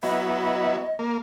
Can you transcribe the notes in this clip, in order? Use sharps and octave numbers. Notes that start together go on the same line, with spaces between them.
F#3 B3 E4 D#5
A#3